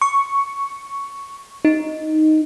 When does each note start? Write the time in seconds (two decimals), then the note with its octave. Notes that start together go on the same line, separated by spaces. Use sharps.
0.02 C#6
1.65 D#4